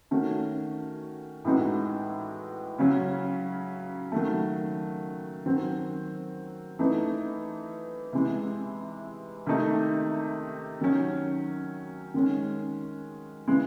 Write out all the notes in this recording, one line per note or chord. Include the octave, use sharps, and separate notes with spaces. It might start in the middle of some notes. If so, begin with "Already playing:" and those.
D#3 A3 C#4 F#4
A2 E3 G#3 D#4 F#4
C#3 F#3 C#4
D#3 F#3 A3
D#3 F#3 C4
E3 A3 D#4
C3 E3 G#3
C3 D#3 A3 D#4
D#3 F#3 C#4
D#3 G#3 C#4
C#3 E3 G#3